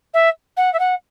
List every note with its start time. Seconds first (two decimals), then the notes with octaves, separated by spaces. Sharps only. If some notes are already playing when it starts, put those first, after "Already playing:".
0.14 E5
0.57 F#5
0.73 E5
0.79 F#5